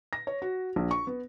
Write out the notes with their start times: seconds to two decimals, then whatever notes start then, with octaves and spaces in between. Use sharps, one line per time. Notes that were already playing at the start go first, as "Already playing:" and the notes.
0.13 A#6
0.27 C#5
0.42 F#4
0.76 A#1
0.91 C#6
1.07 B3